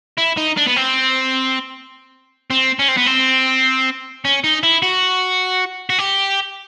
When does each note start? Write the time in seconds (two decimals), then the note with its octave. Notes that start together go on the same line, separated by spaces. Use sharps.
0.18 E4
0.37 D#4
0.57 D4
0.67 B3
0.76 C4
2.50 C4
2.79 C#4
2.88 C4
2.97 B3
3.06 C4
4.25 C#4
4.44 D#4
4.63 E4
4.82 F#4
5.90 F#4
5.99 G4